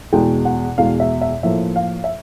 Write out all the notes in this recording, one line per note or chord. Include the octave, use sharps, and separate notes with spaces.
E2 B2 G#3 G5
F#5
E2 B2 G#3 F5
E5
E5
A2 F3 A#3 E5
F5
E5